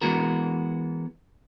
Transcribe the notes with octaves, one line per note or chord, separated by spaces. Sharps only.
E3 G#3 B3 F#4 A#4